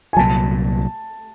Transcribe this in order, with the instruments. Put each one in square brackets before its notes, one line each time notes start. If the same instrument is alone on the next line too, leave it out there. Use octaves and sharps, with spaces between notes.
[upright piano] G#5
[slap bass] C2 A#2 F#3 [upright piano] A5